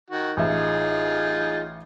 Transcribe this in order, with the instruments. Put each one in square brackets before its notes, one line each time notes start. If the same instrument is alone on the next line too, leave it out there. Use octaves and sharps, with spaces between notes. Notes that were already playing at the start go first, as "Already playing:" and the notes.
[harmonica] D#3 F#4
[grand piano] A1 E5 [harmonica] D#4 F4 G#4